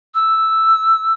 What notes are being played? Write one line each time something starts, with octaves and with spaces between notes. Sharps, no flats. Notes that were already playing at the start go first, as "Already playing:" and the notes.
E6